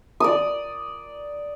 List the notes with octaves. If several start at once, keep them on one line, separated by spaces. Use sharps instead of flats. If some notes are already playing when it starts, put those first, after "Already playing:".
D5 D#6